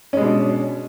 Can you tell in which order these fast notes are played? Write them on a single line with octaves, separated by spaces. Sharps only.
C#4 G#3 B2 D4